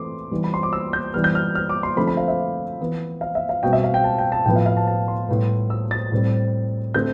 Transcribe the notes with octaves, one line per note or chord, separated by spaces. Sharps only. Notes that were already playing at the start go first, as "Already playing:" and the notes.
Already playing: E3 A3 C4 C6 D6
E3 G3 B3
B5
C6
D6
E6
G6
E3 G3 B3 F6
G6
F6
F6
D6
C6
D3 F3 A3 C4 B5
B5
F5
E5
E3 B3
F5
E5
F5
B2 G3 C4 G5
E5
F5
G5
A5
G5
A5
A2 F3 B3 G5
F5
F5
A5
A5
C6
A2 G3 B3
E6
A6
A2 G3 C4
D3 A3 C4 G6